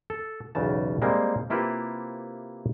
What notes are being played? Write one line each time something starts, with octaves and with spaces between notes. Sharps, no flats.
A4
B1 E2 C#3 A5
G3 G#3 A#3 C4
C3 A#3 E4 F4 G4 B4